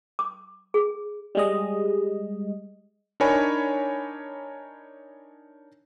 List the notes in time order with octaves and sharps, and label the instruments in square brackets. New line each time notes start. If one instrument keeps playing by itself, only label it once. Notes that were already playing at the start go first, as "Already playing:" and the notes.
[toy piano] D6
G#4
[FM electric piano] G3 G#3 D#5
[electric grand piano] D4 D#4 A#4 C#5 G#5 B5